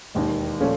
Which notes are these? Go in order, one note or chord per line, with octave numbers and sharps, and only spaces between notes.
E1 D#2 D#3
A#2 F3 A3 C#4